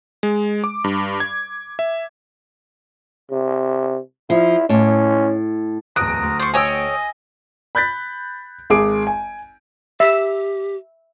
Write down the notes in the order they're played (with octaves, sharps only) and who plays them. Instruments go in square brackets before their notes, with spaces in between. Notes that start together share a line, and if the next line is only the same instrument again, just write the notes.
[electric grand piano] G#3
D6
G2
G#6
E5
[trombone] C3
[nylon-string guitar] F3 [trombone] E4
[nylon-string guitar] A2 [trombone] C#4
[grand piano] D1 E2 [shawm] A#5 [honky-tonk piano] D#6 D7 [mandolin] F#6
[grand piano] D2
[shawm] C5 [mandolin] D5 C#6
[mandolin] A4 C#5 G5 [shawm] D#5 [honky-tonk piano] G#5 D#6 E6
[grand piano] B5 F#6 G6 A6 B6
G#1 G#4 D6 D7
G#5
[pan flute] G4 [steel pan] E5